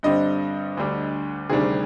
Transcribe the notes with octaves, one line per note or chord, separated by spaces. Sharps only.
G2 D3 G3 C4 D#5
D2 D3 G3 D4
D2 C3 D#3 G3 D4 G#4